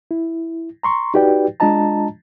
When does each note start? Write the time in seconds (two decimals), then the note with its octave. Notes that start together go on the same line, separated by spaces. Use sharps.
0.11 E4
0.83 A#5 C6 C#6
1.14 D#4 F#4 G4 B4 D5 G5
1.60 G#3 D4 F4 D#5 A5 A#5